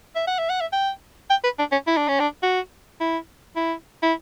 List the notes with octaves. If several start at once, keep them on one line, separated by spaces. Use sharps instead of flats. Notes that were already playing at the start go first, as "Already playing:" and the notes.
E5
F#5
E5
F#5
E5
G5
G5
B4
D4
C#4
E4
D4
C#4
D4
F#4
E4
E4
E4